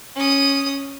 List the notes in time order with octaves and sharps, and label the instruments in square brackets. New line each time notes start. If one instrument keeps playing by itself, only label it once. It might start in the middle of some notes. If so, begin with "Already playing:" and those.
[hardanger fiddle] C#4 D#6